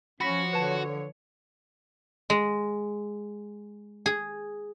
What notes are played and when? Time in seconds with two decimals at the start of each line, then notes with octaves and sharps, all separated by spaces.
0.21 F3 C#4 F#4 C#5 B5 A#6 B6
0.53 D3 B4 A5
2.30 G#3
4.06 G#4